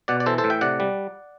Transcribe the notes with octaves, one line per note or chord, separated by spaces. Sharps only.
B2 D5 F#5
D5
E3 A4 C5
A4 C5
A2
E5 G5
C3 D5 F#5
G3